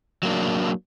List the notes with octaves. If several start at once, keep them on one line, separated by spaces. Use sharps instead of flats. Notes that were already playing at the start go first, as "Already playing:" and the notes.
F#3 A#3 D4